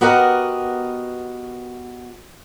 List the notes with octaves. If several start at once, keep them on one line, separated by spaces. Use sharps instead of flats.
B3 F#4 G4 A#4 D#5 F#5